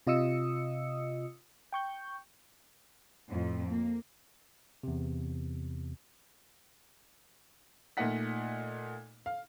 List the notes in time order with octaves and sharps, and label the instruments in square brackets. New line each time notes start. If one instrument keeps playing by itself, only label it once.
[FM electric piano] C3 F4 D#5 D#6 E6 C#7
G5 C#6 G6
[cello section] F2 A2
A#3
[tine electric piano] E2 C3
[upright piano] A#2 A3 D#4 D#5 F#5 B6
F5